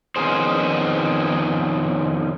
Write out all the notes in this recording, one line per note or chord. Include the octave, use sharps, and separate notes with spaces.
F2 D#3 B3 C#4 G#4 C5